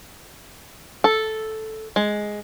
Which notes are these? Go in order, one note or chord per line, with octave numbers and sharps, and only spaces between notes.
A4
G#3